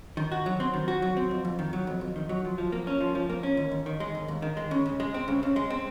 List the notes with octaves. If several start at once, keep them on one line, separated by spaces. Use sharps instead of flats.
D#3
F#4
F#3
C4
D#3
F#4
F#3
C4
F2
F2
D#3
F#3
F2
F2
D#3
F#3
F3
F3
A#3
C#4
F3
F3
A#3
C#4
D#2
D#2
D#3
G#3
D#2
D#2
D#3
G#3
C#3
C#3
G#3
C4
C#3
C#3
G#3
C4